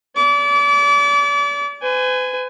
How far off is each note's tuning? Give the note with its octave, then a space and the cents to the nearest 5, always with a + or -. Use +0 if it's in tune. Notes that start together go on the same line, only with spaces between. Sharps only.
D5 -40 D6 -30
B4 +45 G#5 -5